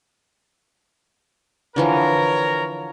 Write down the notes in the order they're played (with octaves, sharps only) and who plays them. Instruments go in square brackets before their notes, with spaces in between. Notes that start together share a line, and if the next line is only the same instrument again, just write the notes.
[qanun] D3 E3 F3 [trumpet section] A#4 C#5 A#5